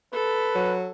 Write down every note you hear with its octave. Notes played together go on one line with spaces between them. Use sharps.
A4 B4
F#3